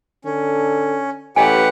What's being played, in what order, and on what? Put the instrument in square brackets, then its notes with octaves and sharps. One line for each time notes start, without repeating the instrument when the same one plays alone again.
[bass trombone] D3 [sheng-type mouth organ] C#4
[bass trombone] A1 [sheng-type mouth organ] G4 B4 F#5 [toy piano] D#5 G#5